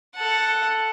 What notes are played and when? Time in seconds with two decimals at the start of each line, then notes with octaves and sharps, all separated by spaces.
0.16 A4 F#5